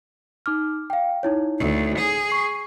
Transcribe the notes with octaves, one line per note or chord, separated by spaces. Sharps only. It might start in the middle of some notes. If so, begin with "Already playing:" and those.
D#4 D6 F6
F5 G5
D#4 E4 C#5
D2
G#4
C#6 C7